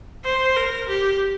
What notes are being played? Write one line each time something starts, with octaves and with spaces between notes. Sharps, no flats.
C5
A#4
G4